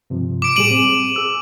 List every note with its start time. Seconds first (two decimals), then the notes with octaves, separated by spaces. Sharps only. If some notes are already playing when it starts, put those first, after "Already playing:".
0.10 G2 C3 F3
0.42 D6 D7
0.56 A2 G3 G#4 D7 D#7 F#7
0.71 C4
1.16 G#4 E6